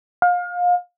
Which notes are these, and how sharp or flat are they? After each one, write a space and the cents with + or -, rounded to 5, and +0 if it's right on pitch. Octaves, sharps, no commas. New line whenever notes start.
F5 +30